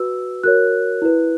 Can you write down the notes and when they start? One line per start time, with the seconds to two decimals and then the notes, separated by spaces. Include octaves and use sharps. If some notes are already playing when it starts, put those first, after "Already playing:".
Already playing: F#4 B4 E6
0.43 F#4 A#4 C#5 F#6
1.02 E4 B4